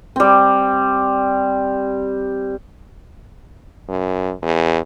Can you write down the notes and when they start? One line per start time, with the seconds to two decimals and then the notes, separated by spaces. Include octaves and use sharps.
0.16 G3 C4
3.89 F#2
4.42 E2